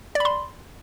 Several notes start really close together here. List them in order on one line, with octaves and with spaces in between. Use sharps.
D5 B5 C6